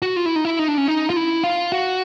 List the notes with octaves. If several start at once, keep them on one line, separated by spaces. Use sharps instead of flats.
F#4
F4
E4
D#4
E4
D#4
D4
C#4
D#4
F4
E4
F4
F#4